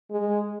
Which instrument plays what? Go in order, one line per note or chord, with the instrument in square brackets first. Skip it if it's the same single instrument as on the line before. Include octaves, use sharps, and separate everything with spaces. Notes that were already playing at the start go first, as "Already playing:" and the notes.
[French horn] G#3